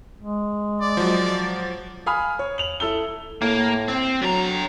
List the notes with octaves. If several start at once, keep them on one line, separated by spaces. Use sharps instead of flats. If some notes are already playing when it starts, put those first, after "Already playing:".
G#3
D5
F3 F#3
F5 G#5 B5 D#6 F6
C#5
F7 F#7
E4 A4 E6 G7
A2 A#3
C4
D3 F#3 A#5